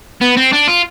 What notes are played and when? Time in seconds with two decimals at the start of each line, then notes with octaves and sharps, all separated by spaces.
0.21 B3
0.37 C4
0.52 D4
0.68 F4